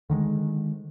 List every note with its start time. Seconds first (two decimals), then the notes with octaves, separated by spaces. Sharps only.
0.10 D3 D#3 G3 G#3